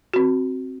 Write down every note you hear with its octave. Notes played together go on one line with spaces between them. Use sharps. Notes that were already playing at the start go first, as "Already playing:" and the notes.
C4 F#4